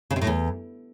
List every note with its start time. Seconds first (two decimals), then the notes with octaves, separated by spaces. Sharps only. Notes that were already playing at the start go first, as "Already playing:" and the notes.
0.11 C#3
0.16 C3
0.21 A2
0.27 E2